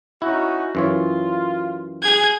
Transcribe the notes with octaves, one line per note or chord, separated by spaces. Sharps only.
C#4 D#4 E4 F#4
F#2 E3 F4 C#5
G#4 G#6